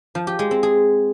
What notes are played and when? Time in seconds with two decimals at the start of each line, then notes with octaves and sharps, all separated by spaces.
0.15 F3
0.27 G4
0.39 G#3
0.51 C4
0.63 G#4